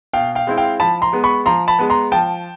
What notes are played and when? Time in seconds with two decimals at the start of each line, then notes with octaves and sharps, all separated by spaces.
0.13 B2 F5 G5
0.35 F5 G5
0.47 G#3 C4 E4
0.58 F5 G5
0.80 F3 A5 B5
1.02 A#5 C6
1.13 G#3 B3
1.24 B5 C#6
1.46 F3 A#5 C6
1.68 A5 B5
1.79 G#3 B3
1.90 A#5 C6
2.12 F3 G5 A5